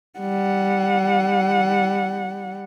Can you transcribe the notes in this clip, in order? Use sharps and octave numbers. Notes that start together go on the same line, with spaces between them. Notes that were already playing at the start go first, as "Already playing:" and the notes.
G3 F#5